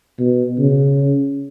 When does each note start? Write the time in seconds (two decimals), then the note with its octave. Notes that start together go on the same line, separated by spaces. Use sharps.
0.19 B2
0.58 C#3